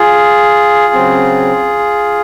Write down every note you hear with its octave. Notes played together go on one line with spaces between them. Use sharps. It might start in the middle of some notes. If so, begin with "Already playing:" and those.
Already playing: F4 G#4
C#3 F#3 C4